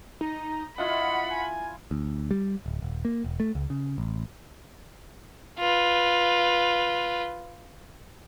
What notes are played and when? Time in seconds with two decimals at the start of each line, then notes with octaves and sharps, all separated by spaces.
0.21 D#4 A#5
0.78 E4 F4 D#5 F5 F#5 B5
1.30 G#5
1.91 D2
2.31 G3
2.66 D1
2.82 D#1
3.05 A#3
3.24 E1
3.40 A3
3.55 C#2
3.70 C#3
3.98 A1
5.59 F4 B4